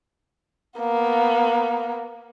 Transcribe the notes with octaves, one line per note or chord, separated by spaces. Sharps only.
A#3 B3